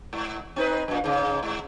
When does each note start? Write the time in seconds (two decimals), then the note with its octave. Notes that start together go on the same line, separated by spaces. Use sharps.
0.13 G#2
0.56 C4 D#4 B4
0.88 F#2 A#2
1.04 G#2 C#3
1.43 G#2